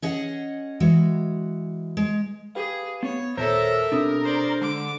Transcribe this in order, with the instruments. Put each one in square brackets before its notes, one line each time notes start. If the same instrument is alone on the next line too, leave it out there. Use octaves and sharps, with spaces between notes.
[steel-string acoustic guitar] C#4 G#4 D#5 F#5
E3 G#3 F#4
G#3
[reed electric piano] G4 B4 F5 [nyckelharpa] G#4
[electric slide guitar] B3 [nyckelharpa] C#5
[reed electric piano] D#2 A#2 A5 [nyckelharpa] A4 E5 [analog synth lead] A#4 [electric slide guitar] C5 C#5
[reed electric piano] B2 C4 D#6 [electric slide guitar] D4 G4
[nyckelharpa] C5 D5
[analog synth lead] D3 [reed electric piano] G#3 [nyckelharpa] D6